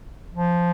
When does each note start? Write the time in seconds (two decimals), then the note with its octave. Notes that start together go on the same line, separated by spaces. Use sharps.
0.33 F3